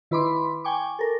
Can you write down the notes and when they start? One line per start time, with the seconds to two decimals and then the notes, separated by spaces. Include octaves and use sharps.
0.11 D#3 E4 B4 B5 C6 D6
0.64 G5 G#5 C#6 D6
0.99 A4 A#4